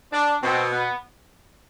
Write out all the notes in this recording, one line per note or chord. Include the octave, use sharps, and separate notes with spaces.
D4
B2 C4
B3